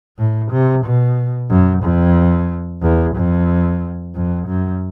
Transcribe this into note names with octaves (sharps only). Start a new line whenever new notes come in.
A2
C3
B2
F#2
F2
E2
F2
F2
F#2